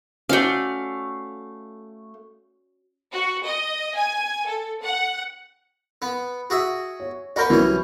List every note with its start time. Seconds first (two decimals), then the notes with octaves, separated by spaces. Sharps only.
0.29 A3 C#4 F#4 D5 F5
3.12 F#4
3.45 D#5
3.96 G#5
4.47 A4
4.82 F#5
6.02 B3
6.50 F#4 G#4 E5
7.00 C#5
7.36 F#4 A#4 B4 D5 B5 G6
7.50 C2 E3 F#3 C#4